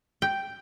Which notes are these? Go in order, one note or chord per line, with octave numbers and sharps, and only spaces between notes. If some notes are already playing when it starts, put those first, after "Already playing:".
G5